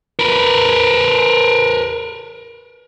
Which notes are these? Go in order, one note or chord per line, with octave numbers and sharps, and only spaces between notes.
A#4 B4